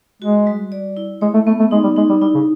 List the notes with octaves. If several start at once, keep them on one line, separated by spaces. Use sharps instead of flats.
G#3 F#4
G3
D5
E4
G#3 C#5
A3
A3 B3
A3
G#3 D#4
G3
G#3 D#4
G3
G3 E4
C#3